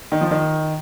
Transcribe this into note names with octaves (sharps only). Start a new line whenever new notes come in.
D#3
F3
D#3